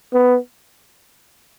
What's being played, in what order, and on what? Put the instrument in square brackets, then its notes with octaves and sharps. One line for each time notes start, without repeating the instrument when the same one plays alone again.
[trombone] B3